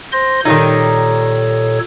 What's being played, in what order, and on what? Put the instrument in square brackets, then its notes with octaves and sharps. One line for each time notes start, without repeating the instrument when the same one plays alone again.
[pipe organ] C5 C6 A#6
[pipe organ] A#2 A4 C#5 [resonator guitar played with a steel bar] D#3 G3 D#4